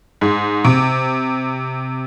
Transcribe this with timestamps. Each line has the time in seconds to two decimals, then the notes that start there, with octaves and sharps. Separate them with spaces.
0.21 G#2
0.65 C3